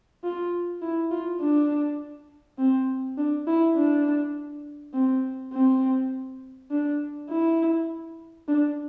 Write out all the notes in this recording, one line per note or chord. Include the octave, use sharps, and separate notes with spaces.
F4
E4
F4
D4
C4
D4
E4
D4
C4
C4
D4
E4
D4